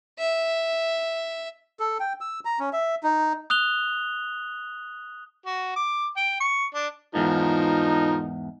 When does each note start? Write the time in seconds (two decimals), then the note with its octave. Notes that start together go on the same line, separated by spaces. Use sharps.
0.19 E5
1.80 A4
2.00 G5
2.21 E6
2.45 A#5
2.59 C#4
2.73 E5
3.03 D#4
3.50 D#6 F#6 F7 G7
5.46 F#4
5.76 D6
6.17 G5
6.40 C#6
6.74 D4
7.15 E2 G#2 F3 D#4 A#4